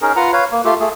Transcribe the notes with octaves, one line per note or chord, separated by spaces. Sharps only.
C#4 D#4 G#4 A#4
F4 B4 F#5 A#5
B4 C#5 F5
A#3
A3 F4 G4
A3 G#4